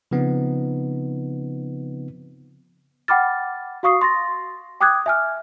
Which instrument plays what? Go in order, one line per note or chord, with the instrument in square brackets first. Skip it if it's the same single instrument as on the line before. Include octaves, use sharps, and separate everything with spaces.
[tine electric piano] C#3 F3 B3 C4 D#4
[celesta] F#5 G5 B5 D6 F6 A6
F#4 F5 C#6 D#6 C7
C6 A6 A#6
G5 D6 D#6 F#6 G#6
E5 G#5 F6